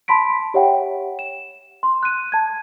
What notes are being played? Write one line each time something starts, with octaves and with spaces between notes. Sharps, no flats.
A5 B5 C6 B6 D7
G4 C#5 E5 F#5 G5
E7
C6
F#6 D#7
A5 G#6